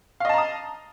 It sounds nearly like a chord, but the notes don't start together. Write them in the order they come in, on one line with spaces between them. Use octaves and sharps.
F5 D#5 A5 A#5 D#6